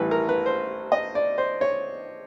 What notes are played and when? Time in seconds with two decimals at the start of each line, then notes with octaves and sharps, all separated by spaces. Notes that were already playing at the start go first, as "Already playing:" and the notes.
Already playing: A1 A2 E3 G3 B4
0.11 A#4
0.29 B4
0.46 C5
0.92 D#5
1.15 D5
1.38 C5
1.61 C#5